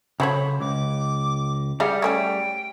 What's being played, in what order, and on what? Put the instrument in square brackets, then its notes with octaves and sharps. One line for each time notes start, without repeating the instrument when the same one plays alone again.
[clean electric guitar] C#3 C5 B5 [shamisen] F#3 A4 C#5
[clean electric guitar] C#2 [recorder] D6
[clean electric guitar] G3 G4 [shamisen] G#4 D#5 F5 [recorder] F#5
[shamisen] A3 C#4 F#4 [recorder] G5